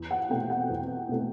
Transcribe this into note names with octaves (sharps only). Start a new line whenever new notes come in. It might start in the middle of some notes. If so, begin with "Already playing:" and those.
Already playing: E2
F#5
B2 A3 C4 G5
F#5
E2
B2 A3 C4